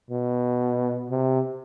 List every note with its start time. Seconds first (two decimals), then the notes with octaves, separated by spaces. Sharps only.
0.11 B2
1.11 C3